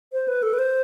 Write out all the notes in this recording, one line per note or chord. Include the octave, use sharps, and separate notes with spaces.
C5
B4
A4
B4
C5